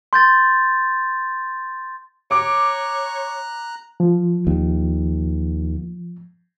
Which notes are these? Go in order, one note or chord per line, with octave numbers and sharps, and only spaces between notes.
C6 G6 A6
C#5 A#5 D6 F#6
F3
D#2